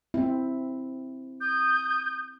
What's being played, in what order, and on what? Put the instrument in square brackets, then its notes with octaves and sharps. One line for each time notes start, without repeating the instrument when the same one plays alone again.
[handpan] C4 E4
[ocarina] D#6 [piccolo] G6